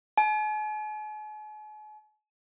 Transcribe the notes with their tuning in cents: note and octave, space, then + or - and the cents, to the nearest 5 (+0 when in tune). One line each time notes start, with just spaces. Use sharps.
G#5 +45